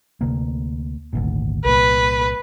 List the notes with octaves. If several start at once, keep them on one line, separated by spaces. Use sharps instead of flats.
D2 C3 A#3
G#1 D2 A#2
C2 A#2 B4